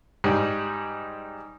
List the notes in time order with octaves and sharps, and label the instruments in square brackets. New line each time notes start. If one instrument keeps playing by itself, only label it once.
[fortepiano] G#2 G3